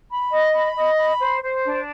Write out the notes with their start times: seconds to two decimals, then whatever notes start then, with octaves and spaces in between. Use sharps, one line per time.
0.10 B5
0.32 D#5
0.54 B5
0.75 D#5
0.98 B5
1.21 C5
1.42 C5
1.64 D4